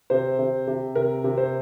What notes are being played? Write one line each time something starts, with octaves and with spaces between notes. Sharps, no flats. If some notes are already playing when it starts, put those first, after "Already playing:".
C3 C5
C3
C3
C3 A#4
C3
C5